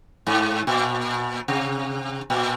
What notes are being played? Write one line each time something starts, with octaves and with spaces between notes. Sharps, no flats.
G#2
A#2
C3
A#2